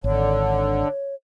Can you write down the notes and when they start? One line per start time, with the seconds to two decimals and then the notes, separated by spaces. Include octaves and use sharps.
0.04 G#1 D3 C#5